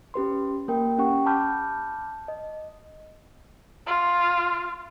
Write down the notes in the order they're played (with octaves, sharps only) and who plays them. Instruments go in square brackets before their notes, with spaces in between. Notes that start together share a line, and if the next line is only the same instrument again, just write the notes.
[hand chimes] C#4 G4 B4 C6
A#3 A#4 G5
C#4 G4 F#5 G5 C#6
A5 B5 D6 F6 G6
D#5
[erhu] F4